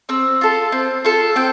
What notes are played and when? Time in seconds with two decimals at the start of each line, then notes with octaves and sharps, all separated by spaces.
0.09 C4 E6
0.41 F4 A4
0.72 C4
1.05 F4 A4
1.36 C4 G5